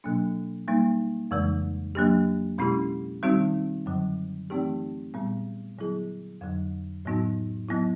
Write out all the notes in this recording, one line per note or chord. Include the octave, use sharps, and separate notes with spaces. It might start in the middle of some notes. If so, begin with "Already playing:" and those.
B2 F#3 A#3 D4
G3 A#3 D#4
F2 C#3 E3 G#3
F#3 A#3 D4 G4
B2 G#3 C#4 E4 G4
D#3 G3 C4 D#4 F#4
F#2 D3 F#3
E3 A3 C4 D#4 G4
A#2 G3 B3
D3 F#3 B3 E4 G#4
F2 D3 F#3
A2 F#3 B3 D#4 F#4
F#3 B3 E4